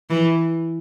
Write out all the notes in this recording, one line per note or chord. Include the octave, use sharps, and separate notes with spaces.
E3